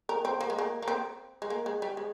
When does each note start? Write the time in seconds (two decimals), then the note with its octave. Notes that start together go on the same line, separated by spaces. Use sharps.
0.09 A#4
0.25 C4
0.41 A#3
0.50 G#3
0.59 A#3
0.82 A#3
0.88 C4
1.42 G#3
1.50 A#3
1.66 G#3
1.82 G3
1.97 G#3